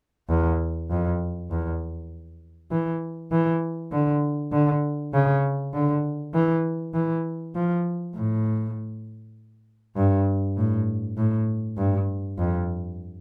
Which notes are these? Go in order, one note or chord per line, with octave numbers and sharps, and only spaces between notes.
E2
F2
E2
E3
E3
D3
D3
C#3
D3
E3
E3
F3
A2
G2
A2
A2
G2
F2